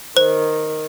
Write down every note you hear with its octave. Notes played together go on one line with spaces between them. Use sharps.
D#3 C5